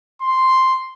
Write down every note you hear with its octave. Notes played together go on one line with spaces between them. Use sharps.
C6